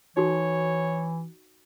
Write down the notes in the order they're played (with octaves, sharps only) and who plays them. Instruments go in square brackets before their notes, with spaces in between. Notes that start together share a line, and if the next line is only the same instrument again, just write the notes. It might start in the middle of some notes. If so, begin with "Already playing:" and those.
[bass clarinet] E3 [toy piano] D#4 F#4 A4 [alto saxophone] C#5